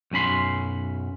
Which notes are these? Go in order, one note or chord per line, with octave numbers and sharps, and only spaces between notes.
B1 F#2 C#4 B5 C6